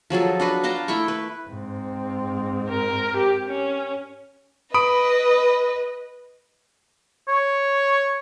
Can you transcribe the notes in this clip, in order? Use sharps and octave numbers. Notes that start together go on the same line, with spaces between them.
F3 F#3 G#4 A4
D4 F#4 B4
F5 G5 A5 A#5
A3 E4 G5 C#6
B4
G#2 C4
A#4
G4
C#4
B4 D#5 B5 D#6 D7
C#5